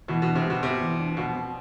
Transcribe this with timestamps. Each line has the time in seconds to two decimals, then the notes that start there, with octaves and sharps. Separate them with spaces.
0.08 B2 E3
0.22 B2
0.27 D4
0.35 C3
0.45 B2 G3
0.63 C3 B3
0.81 E3
0.99 D4
1.17 B2 F3
1.35 C4